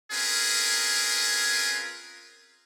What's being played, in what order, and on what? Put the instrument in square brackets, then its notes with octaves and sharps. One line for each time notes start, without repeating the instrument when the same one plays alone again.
[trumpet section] C4 C#4 F4 G#4 A#4 B4